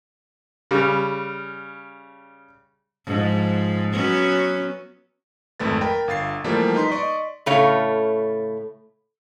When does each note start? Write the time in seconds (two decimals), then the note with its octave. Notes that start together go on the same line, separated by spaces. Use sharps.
0.71 C#3 G3
3.06 G#2 F3
3.92 F#3 B3 C#4
5.60 G#1 F2 A3 B4 A6
5.81 A#4 G5 B5
6.08 G1 F5 A6 C7
6.44 E3 F3 G3 A3 A#3
6.75 D#4 B4 C6 B6
6.91 D5 D#5 C6 C#6
7.46 A2 C#3 A3 C#5 F5